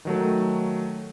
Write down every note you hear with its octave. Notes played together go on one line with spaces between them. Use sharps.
D#3 F#3 A3